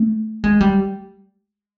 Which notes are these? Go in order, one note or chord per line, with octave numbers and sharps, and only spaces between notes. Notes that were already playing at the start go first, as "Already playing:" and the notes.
Already playing: A3
G#3
G3